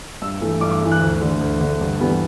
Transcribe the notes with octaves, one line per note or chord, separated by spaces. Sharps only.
G2 E6
E3 A3
G2 D6
D6
E3 A3
F#6
D2
D3 A3
D2
D3 A3
G2
E3 G3 B3